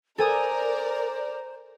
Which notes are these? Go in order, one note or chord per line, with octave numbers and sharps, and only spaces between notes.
A4 A#4 C5 D5 G#5 D#6